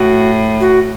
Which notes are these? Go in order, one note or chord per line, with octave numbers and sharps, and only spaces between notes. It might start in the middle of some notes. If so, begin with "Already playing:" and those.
Already playing: A2 F#4
F#4